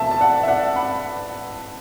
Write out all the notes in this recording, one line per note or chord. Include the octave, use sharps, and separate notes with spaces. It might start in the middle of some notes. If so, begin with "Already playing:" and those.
Already playing: E1 E2 B2 A3 E5 A5
A5
D5 F#5
E5
D5 F#5
F#5 B5